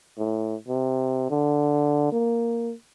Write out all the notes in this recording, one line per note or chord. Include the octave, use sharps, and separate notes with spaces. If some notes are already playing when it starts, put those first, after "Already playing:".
A2
C3
D3
A#3